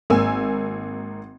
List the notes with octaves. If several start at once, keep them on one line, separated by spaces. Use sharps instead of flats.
G#1 A#3 G#5 E6